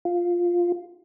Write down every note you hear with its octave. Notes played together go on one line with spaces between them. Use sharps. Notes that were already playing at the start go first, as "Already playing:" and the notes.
F4